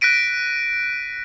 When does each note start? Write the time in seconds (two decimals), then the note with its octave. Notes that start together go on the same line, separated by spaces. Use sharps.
0.01 F#6 A#6 B6 D7 D#7